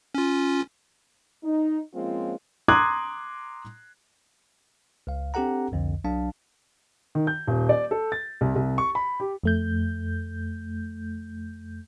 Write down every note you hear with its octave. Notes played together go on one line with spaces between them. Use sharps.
C#4 F4
D#4
F3 G#3 A#3 C4 C#4 F4
A#5 C6 D6 D#6 F#6 G#6
C#2 F5
C4 D4 G4 A4 F#5 A#5
C2 F2 D3
B1 F#3 D4 F5 A5
D#3
G6
D#1
D5
A4
A6
C2
C2
C#6
B5
G4
F2 A3 G6